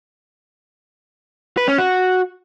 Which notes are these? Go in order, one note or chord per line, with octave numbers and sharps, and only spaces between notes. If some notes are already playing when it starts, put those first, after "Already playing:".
B4
C#4
F#4